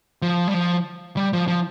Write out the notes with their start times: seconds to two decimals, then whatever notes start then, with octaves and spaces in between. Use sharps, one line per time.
0.22 F3
0.48 G3
0.54 F3
1.17 G3
1.33 F3
1.48 F3